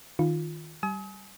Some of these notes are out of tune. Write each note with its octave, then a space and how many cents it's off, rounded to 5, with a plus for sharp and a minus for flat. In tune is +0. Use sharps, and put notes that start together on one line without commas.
D#3 +0 F4 +0
G3 -10 G#5 +35 D#6 +40